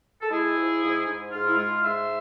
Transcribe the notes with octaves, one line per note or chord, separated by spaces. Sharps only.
A4
G#3 E4 G#4
F3
G#2
G#2
G#2 F4
E4
G#3 F4
G#2 C5 E5